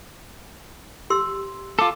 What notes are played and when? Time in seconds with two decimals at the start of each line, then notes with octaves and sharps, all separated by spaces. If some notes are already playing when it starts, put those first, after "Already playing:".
1.10 G4 C6 E6
1.79 F4 A4 D6